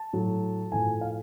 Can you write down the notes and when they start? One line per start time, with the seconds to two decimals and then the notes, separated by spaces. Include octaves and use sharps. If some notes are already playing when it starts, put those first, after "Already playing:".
Already playing: A5
0.13 A2 F#3
0.72 A2 F3 G#5
1.01 F5